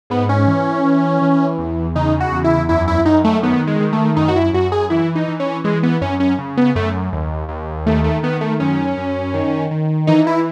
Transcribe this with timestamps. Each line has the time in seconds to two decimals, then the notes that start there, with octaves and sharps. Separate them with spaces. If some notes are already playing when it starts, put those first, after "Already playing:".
0.10 G#2 B3
0.29 C#4
0.47 E3
0.84 E3
1.22 E3
1.58 E2
1.95 C#3 D#4
2.20 F#4
2.32 E2
2.44 E4
2.69 F#2 E4
2.88 E4
3.05 F#2 D#4
3.24 A3
3.43 D#3 B3
3.67 G#3
3.80 D#3
3.93 A3
4.16 F#2 D#4
4.28 F#4
4.36 E4
4.53 F#2 F#4
4.72 G#4
4.90 E3 E4
5.15 D#4
5.28 E3
5.40 C#4
5.64 E3 G#3
5.83 B3
6.01 F#2 C#4
6.20 C#4
6.39 C#3
6.57 B3
6.75 F#2 A3
7.13 D#2
7.49 D#2
7.86 D#3 A3
8.04 A3
8.23 D#3 B3
8.41 A3
8.60 F#2 C#4
8.97 F#2
9.34 D#3
9.71 D#3
10.07 E3 D#4
10.27 E4